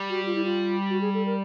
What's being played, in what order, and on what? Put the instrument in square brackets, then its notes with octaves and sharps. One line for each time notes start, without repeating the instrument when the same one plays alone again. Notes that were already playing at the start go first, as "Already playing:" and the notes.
Already playing: [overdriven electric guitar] G3
[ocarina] F#4
F4
E4
F4
F#4
G#4
A4
A#4